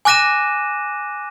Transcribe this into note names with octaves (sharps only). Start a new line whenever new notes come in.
G#5 D6 F#6 A#6 D#7 E7